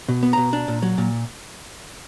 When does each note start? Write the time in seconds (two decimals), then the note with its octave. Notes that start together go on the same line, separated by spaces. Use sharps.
0.08 B2
0.23 B3
0.33 B2 A#5
0.53 D4
0.68 A#2
0.82 F#3
0.98 A#2